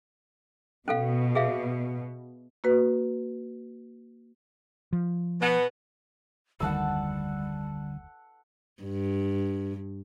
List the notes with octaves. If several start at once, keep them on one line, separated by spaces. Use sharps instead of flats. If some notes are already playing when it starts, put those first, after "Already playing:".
B2 C#4 A4 F5
G#4 E5 F5
A#3 F#4 B4
F3
B2 B3
F1 D2 D3 D#3 G3 F#5 A5 E6
G2